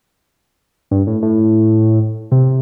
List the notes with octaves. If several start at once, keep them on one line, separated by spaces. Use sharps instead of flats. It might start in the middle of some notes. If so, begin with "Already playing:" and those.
G2
A2
A2
C3